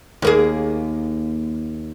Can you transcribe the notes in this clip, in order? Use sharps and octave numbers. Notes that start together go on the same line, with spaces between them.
D#2 A#3 G#4